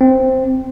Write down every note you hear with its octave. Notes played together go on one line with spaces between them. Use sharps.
C4